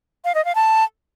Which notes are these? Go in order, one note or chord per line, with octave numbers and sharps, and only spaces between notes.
F5
D#5
F5
A5